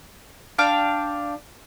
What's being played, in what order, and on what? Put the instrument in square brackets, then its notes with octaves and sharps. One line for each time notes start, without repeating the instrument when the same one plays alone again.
[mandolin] D4 F5 G5 D6